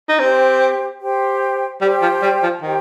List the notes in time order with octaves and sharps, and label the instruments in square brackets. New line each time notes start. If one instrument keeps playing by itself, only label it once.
[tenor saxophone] D#4
[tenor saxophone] C4 [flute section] G4 C5 G5
[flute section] G4 C5 G5
[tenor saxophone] G3 [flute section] G4 C5 G5
[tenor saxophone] F3
G3
F3
[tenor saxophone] D#3 [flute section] G4 C5 G5